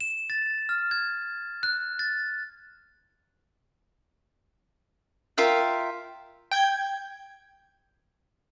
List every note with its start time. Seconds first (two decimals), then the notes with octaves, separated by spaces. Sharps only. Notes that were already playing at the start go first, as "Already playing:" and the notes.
0.01 E7
0.30 A6
0.69 F6
0.91 G#6
1.63 F#6
1.99 A6
5.37 F4 A#4 E5 G5
6.52 G5 G6 G#6